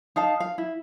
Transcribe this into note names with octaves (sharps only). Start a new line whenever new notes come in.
D#4 F5 A5
F5
E4